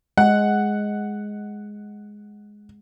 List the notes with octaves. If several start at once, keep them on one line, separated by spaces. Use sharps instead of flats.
G#3 F#5